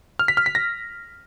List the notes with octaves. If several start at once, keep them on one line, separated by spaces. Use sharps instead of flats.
F6
B6
F6
B6
A#6